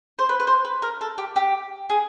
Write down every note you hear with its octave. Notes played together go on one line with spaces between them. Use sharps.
C5
B4
B4
C5
B4
A#4
A4
G4
G4
G#4